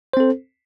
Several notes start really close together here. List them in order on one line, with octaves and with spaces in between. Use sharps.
C5 C4 A4